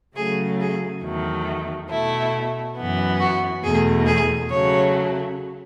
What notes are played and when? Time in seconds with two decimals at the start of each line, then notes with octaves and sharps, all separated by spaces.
0.16 C#3 F#3 A3 G#4
0.60 G#4
1.03 E2 D#3 F#3 A3
1.90 B2 A3 E4
2.76 F#2 E3 B3
3.20 F#4
3.63 E2 B2 A3 G#4
4.06 G#4
4.50 C#3 F#3 A3 C#5